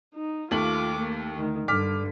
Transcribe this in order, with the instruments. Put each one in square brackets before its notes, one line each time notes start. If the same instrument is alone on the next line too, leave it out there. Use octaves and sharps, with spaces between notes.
[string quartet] D#4
[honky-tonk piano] D#2 A3 F#7 [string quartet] F4 D6
[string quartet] A#3
D2 D#3
[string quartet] G2 D3 [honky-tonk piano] D6 F6 B6